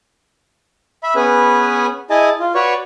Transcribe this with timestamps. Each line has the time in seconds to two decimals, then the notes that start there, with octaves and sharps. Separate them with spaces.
1.03 E5 B5
1.16 B3 C#4 G#4 B4 G#5
2.10 E4 G#4 D#5 G#5 A5
2.40 F4
2.55 F#4 B4 C#5 D5 C#6